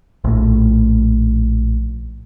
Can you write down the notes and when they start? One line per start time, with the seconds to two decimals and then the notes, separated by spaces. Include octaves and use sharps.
0.24 A#1 A2